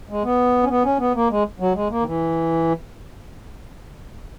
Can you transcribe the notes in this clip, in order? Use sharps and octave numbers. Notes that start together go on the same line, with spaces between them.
G#3
B3
C#4
B3
C#4
B3
A#3
G#3
F#3
G#3
A#3
D#3
E3